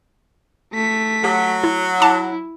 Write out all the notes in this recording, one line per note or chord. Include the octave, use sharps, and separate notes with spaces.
A3 B6
F#3 G4
E4
E4 A5 D6